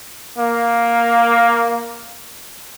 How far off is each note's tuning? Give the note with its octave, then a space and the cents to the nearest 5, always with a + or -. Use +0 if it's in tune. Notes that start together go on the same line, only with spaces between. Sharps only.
A#3 +5